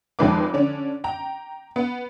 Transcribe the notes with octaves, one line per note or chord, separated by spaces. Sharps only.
F1 F2 D#3 G#3 B4 D6
D3 C#4 D4
G5 A#5
B3